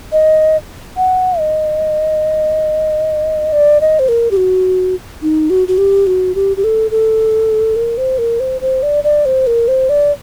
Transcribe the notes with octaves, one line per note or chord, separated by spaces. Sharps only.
D#5
F#5
D#5
D5
D#5
C5
A#4
G4
F#4
D#4
F#4
F#4
G4
F#4
G4
G4
A4
A4
A#4
C5
A#4
C5
C5
D5
D5
C5
A#4
C5
D5